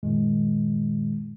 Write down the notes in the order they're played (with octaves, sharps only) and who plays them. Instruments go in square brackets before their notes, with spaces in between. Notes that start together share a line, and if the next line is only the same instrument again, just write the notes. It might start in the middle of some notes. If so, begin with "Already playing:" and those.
[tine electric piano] F#2 A#2 D#3 G#3